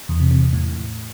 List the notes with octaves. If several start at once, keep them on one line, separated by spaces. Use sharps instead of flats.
E2
C3
C3
E2
A2